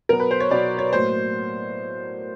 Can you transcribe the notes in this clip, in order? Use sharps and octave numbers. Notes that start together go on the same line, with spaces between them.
B2 F#3 B3 A#4
B4
C5
C#5
B2 F#3 B3 D5
C#5
A2 F#3 A#3 C5